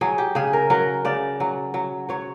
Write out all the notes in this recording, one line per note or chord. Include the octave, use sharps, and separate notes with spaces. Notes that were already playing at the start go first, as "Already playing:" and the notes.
F#3 G#4
G4
C#3 G#4
A#4
F#3 A#4
C#3 D5
F#3
F#3
F#3 C#5